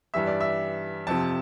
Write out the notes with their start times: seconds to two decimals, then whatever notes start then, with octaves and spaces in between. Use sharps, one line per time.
0.14 G2 E3 G3 E5
0.27 D5
0.41 E5
1.07 F2 C3 F3 A5